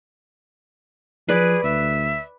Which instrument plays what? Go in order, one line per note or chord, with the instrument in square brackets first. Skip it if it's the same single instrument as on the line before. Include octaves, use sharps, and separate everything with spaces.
[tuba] F3 [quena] G#4 [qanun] B4 D5
[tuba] D2 [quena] E5